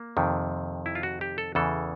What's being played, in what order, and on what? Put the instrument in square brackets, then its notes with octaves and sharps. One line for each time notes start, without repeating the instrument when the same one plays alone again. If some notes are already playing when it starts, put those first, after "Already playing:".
Already playing: [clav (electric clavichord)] A#3
F2 C3 D#3
E4
F4
F#4
G4
A4
E2 C#3 E3 A4